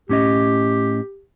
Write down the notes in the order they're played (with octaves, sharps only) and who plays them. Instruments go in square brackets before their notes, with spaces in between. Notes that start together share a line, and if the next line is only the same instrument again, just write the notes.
[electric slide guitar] A2 C#4 D#5 [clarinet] G4